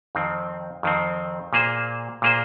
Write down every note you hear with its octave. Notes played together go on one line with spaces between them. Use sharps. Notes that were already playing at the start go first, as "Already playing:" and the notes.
F2 D#3 C4
F2 D#3 C4
A#2 A#3 G#4 C5
A#2 A#3 G#4 C5